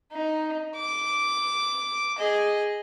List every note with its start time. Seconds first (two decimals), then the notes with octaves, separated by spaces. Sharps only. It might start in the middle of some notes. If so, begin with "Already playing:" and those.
0.13 D#4
0.76 D6
2.19 G#4 D#5